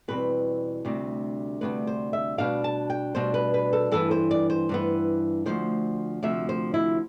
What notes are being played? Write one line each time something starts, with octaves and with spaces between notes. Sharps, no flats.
E2 B2 G3 C4 B4
D2 C3 G3 D4
D2 C3 G3 D4 B4
C5
E5
B2 G3 D4 F5
A5
G5
B2 G3 D4 C5
B4
B4
A4
G2 E3 B3 A4
C5
D5
C5
G2 E3 B3
D2 C3 F3 C5
D2 C3 F3 E5
C5
E4